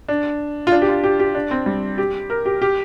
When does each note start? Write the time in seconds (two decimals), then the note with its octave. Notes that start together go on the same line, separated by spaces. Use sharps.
0.08 D4
0.67 F4
0.72 D4
0.82 G4
0.88 F4
1.04 G4
1.20 G4
1.35 D4
1.51 C4
1.66 G3
1.98 G4
2.30 A#4
2.46 G4
2.62 G4